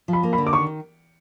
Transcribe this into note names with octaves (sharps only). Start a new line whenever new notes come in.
F3
B5
A#3
B5
D3
D6
D#3 C#6